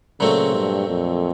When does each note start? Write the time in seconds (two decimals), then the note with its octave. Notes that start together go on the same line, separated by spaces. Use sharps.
0.20 A#2 C#3 F#3 A3 C4
0.54 G2
0.89 F2